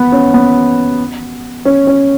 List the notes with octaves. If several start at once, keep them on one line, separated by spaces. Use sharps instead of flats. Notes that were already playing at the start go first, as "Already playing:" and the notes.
Already playing: B3
C#4
B3
C#4
C#4